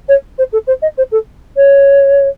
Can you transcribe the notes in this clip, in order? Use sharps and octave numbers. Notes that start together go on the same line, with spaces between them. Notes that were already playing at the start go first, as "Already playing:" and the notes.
C#5
C5
A4
C5
D#5
C5
A4
C#5